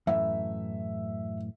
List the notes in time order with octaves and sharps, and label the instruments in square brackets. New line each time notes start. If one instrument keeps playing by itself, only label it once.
[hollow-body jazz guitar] F#2 A2 E3 [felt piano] E5